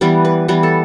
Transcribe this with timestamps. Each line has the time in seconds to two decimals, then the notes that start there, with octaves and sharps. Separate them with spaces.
0.01 E3 G3 B3 B4
0.25 B4
0.48 E3 G3 B3 B4
0.63 A4